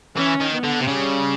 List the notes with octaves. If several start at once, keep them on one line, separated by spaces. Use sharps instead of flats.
E3 C#4
D#3
B3
D3
C3
C#3 G3